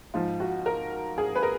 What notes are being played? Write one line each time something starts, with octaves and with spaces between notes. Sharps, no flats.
G#2 F3 F4
F#4
A#4
G#4
B4
A#4